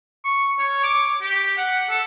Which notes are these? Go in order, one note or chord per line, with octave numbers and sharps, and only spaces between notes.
C#6
C#5
D6
G4
F#5
A4